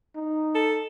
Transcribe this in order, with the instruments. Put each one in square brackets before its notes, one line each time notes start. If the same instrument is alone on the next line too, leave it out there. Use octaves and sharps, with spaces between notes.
[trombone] D#4
[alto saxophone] A4